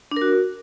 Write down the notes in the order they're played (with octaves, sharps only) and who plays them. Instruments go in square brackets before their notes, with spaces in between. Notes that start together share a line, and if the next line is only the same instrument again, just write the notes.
[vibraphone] D4
A#4
F#4